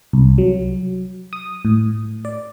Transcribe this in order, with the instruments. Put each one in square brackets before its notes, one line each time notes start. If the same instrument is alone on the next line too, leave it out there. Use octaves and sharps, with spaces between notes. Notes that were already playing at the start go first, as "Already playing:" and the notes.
[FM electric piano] C2
F#3
D#6
A2
D5